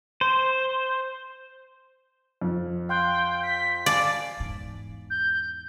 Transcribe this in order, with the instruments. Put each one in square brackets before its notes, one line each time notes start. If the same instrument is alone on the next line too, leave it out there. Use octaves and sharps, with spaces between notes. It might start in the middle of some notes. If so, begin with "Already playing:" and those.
[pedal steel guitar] C5
[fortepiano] F2
[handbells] F5 C6 F#6 [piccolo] G5
[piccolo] B6
[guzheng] D5 [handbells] F5 G#5 [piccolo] A5
[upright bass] E2 G#2
[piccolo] G6